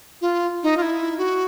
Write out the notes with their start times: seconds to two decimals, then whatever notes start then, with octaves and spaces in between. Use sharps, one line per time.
0.21 F4
0.63 D#4
0.77 F4
0.82 E4
1.18 F#4